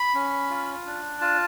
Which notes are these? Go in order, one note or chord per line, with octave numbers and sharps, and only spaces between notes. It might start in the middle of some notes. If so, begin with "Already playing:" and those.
Already playing: B5
C#4
F4
D4
F4 A5